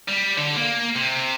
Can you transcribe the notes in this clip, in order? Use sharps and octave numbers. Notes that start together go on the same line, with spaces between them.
G3
D3
A#3
C3